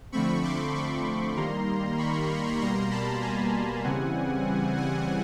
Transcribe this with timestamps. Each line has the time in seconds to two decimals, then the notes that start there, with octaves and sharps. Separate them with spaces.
0.12 D3 F3 A3 C4 B5 C#6
0.43 C6 D6
0.75 B5 C#6
1.36 D#3 G3 A#3 A#5 C6
1.98 B5 C#6
2.61 B2 G3 A#3 A#5 C6
2.91 A5 B5
3.22 G#5 A#5
3.84 C#3 E3 G3 C4 F#5 G#5
4.77 F#5 G#5